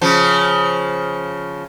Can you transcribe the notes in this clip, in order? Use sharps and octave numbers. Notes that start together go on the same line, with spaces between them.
C#3 F3